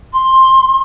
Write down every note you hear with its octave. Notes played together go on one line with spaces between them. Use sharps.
C6